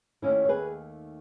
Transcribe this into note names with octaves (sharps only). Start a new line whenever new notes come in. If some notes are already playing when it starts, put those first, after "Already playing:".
D#2 D#3 A3 C#4 E4
C#5
G#4 B4